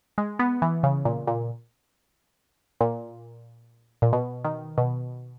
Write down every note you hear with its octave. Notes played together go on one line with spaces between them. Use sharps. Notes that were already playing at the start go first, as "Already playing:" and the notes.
G#3
B3
E3
C#3
A#2
A#2
A#2
A#2
B2
D#3
B2